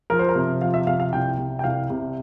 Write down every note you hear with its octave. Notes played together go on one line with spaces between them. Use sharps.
F3 A#4
C5
A#4
C3
F3 F5
E5
C3 F5
F5
C2 G5
C3
G5
C2 F5
C3